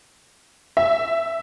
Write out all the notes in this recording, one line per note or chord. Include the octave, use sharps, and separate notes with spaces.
E5